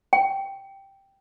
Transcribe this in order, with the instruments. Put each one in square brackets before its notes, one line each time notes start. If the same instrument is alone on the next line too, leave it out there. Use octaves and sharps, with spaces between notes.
[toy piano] G5